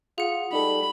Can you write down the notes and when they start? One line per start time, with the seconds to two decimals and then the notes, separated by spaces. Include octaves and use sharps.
0.18 F4 G#4 F#5
0.53 G3 D#4 A4 B5